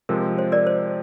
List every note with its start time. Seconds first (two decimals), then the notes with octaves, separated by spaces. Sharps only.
0.09 C3 F3 G#3 A#4
0.38 C5
0.52 A#4 D5
0.67 C5